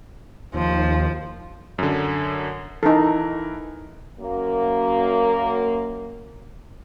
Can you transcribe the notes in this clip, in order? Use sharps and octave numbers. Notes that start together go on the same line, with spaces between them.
D#2 F3
F#2 D3
E3 D#4 A4 A#4
F#2 A#3